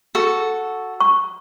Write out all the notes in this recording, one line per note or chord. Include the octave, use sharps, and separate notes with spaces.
F#4 A4
C#6